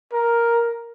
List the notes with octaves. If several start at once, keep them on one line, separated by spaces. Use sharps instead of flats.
A#4